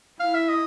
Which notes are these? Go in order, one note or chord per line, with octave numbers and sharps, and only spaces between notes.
E4 F5
E5
D#5